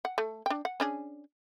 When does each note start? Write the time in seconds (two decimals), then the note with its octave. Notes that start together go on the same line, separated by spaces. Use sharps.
0.05 F#5
0.18 A3
0.46 D4 G5
0.65 F#5
0.80 C#4 D4 G#4